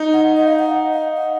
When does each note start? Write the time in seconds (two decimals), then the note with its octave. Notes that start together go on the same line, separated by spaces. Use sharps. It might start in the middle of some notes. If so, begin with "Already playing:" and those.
Already playing: D#4
0.14 F#5
0.37 D#5
0.48 F5
0.59 F#5
0.93 F5
1.17 F#5